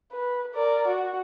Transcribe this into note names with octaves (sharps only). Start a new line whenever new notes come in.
B4
A#4 D5
F#4